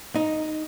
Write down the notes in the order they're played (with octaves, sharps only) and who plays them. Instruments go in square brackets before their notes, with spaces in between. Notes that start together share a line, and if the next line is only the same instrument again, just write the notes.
[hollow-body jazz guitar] D#4